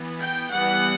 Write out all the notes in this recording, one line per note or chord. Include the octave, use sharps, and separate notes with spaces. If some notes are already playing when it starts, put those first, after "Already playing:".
Already playing: E3 B3
G5
E3 G3 B3 F#5